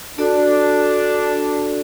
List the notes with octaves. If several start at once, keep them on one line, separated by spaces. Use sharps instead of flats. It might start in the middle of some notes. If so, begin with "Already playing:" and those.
D4 F#4 A4 D5